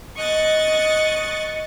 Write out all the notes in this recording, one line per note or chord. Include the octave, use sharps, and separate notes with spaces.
D#5 C#6 F#6 A6